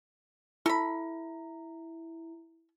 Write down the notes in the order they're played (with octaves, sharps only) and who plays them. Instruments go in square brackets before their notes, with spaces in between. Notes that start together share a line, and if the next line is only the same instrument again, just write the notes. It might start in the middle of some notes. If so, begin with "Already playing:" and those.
[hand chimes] E4 [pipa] A4 B5